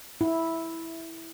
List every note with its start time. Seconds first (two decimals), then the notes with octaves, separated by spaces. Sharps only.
0.21 E4